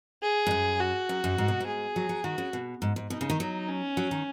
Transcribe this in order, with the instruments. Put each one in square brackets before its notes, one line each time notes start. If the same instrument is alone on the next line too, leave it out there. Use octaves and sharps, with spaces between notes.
[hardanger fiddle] G#4
[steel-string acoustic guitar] G#2
F#2
[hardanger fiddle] F#4
[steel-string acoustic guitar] F#2
F#2
G#2
B2
G#2
[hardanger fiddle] G#4
[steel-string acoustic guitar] F#3
F#3
[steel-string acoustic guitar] D#3 [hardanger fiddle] F#4
[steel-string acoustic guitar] C#3
B2
G#2
G#2
[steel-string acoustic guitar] B2 [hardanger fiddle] D#4
[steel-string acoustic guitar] C#3
D#3
F#3
[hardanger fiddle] C#4
[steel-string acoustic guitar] F#3
D#3